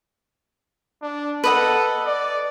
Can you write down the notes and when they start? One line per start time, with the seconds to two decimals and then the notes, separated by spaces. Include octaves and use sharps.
1.02 D4
1.44 A4 B4 D#5 F#5
2.06 D5